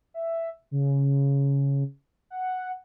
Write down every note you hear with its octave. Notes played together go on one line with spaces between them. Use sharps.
E5
C#3
F#5